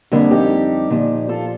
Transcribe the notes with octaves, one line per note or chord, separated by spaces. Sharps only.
F2 D3 G3 A#3
D#4 G4
A#2 F3
F4 A4